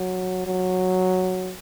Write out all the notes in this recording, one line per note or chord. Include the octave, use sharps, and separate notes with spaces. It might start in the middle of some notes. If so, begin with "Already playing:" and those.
Already playing: F#3
F#3